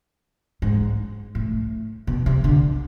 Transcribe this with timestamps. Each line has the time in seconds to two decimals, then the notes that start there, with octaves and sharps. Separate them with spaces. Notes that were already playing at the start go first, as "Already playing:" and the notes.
0.62 G#2
1.35 A2
2.07 B2
2.26 C3
2.44 D3